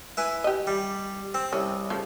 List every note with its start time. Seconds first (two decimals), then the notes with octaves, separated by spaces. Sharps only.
0.17 E4 B4 G#5
0.44 G4 D#5
0.67 G3
1.34 C4
1.53 C2 C#4
1.90 C#3 F3 A3